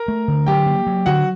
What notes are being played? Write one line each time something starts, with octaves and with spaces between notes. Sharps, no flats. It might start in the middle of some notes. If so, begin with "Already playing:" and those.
Already playing: A#4 A#5
A3
D3
F#3 G4 G5
A#3
F#3
D3 F#4 F#5